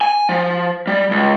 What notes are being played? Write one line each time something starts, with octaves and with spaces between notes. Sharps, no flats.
G#5
F3
G3
C#2